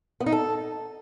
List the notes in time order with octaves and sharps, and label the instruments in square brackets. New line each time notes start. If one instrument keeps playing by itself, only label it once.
[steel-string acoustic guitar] B3
D#4
A4